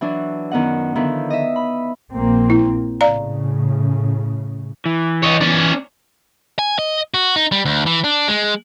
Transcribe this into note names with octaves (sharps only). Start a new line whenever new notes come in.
E3 F#3 D4
F#2 D#3 B3 D#5 F#5
D3 D#3 F3 B3 D4 E4
D#5 E5
B5
A#1 A#3 C4
E4
A2 C#3 D5 F5 A#5
E3
C#5 D#5
C#4 D5
G#5
D#5
F#4
D#4
G3
D2
E3
D4
G#3